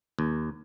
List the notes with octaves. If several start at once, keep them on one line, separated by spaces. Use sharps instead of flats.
D#2